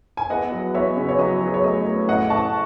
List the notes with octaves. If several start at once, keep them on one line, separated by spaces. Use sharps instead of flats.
G#5
E2 D#5 F#5
F#3
E2 C#5 E5
C#3
C#5
F#3 D#5
F#3
C#5
A3 D#5
A3
A1 D#5 F#5
A1 A5 C#6